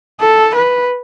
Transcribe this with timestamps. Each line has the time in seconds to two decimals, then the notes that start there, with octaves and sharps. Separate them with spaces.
0.20 A4
0.54 B4